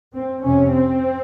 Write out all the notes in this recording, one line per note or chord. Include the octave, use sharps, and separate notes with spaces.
C4
F2 C3 C#4
C4